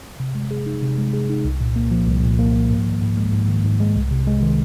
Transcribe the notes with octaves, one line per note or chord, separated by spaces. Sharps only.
C3
G#3
G#4
D#4
C3
G#3
G#4
D#4
C2
A#2
A#3
F3
C2
A#2
A#3
F3
G#2
D#3
G#2
G#3
G#2
D#3
G#2
G#3
C2
C3
G#3
D#3